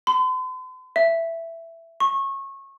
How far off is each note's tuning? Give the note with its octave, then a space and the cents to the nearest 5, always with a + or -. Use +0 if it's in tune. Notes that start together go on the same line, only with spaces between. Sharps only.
C6 -45
E5 +10
C#6 -25